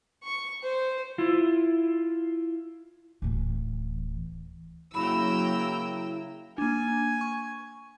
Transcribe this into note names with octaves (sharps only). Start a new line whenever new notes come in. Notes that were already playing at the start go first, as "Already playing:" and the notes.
C#6
C5
E4 F4
D1 E3
C#3 F#3 A#3 E4 G5 A#5 B5 E6
A#3 D4 G#5
C#6